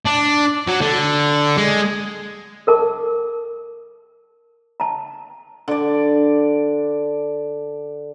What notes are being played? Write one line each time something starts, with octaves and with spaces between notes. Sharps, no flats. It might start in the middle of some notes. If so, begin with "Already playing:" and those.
D4
F#3
D3
G#3
A4 A#4 A5 D6
A5 A#5
D3 D5